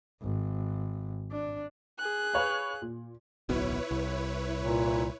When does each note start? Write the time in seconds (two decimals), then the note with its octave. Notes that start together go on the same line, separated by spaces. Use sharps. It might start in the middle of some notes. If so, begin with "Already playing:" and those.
0.22 G#1
1.31 D4
1.98 G#4 F#6
2.34 B4 C#5 F5
2.82 A#2
3.49 D1 B1 B2 E4 B4 C#5
3.91 C2
4.61 A#2